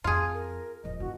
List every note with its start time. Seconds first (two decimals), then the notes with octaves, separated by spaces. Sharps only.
0.04 F2 F4 G#4 A5
0.33 A#4
0.84 D#1 F3 D#5
1.00 G1 E4 F#4